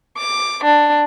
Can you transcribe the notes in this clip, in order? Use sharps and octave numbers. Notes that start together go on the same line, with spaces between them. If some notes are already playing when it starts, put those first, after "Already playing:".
D6
D4